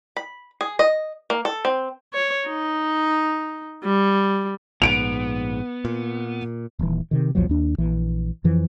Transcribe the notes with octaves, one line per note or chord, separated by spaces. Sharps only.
B5
G#4
D#5
A#3
A4
C4
C#5
D#4
G3
A#1 G#2 B3 D7 F7
A#2
D#1 D#2 E3
C3 D#3
A#1 E2 F3 F#3
D#2 D4
A#1 E3
F2 E3 F3